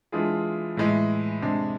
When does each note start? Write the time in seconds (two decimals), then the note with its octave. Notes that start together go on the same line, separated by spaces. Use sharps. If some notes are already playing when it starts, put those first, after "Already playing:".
0.12 E3 G#3 D4 F4 G#4
0.77 A2 E3 G#3
1.42 C3 G#3 D4